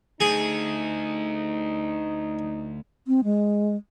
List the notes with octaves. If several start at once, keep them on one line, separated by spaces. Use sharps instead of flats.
D2 D#4 G#4
C4
G#3